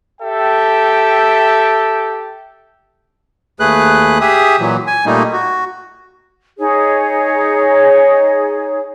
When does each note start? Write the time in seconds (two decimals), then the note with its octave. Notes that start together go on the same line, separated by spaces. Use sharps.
0.21 G4 A4 E5 G5
3.60 D#2 A3 G#4 B4 F#6
4.21 G4 G#4 E5 D#6
4.59 A#2 E3 F#3
4.87 G#5
5.06 A#2 G3 A3 A#3 D#4
5.33 F#4
6.59 D#4 G#4 C#5